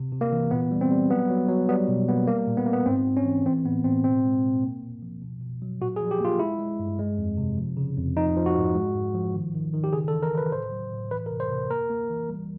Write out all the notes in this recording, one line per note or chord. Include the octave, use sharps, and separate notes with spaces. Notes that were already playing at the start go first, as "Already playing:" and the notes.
Already playing: C3
C3
A#3
E3
A#2 B3
G3
C4
G3
F#3 B3
F#3
F#3
G3 B3
B2
A#3 B3
G3 A#3
A#2
B3
A#3
B3
G#2 C4
G#2
C#4
E3
E3 C4
A2 B3
A2 C4
B2 C4
G#3
B2
A#3
A#2
F3
B2
B2
F#3
A#2 F#4
G#4
F3
G4
A#3 F4
G#3 E4
G#3
G2
G#3
F2
C3
F3
C#3
F2
F3 D#4
F3
F#4
G#2
G#3
G#2
F3
D#3
D#3
D#3
G4
C#3 G#4
A4
E3
A#4
C#3 B4
A2 C5
F#3
A2
E3 B4
A#4
C3
C5
C3
A#3 A#4
A#3
E3
G3